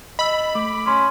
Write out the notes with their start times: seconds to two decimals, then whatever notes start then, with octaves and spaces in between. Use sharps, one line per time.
0.19 D#5 B5 E6
0.55 A3 D6
0.87 C#4 C6